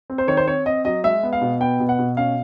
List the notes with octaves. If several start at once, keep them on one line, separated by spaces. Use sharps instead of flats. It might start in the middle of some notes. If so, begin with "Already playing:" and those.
C4
C5
D#3 C#5
C5
C4 C#5
C4 D#5
F#3 D#5
G#3 E5
B3
F5
B2
B3 G5
B2
F#5
B2
C#4 F5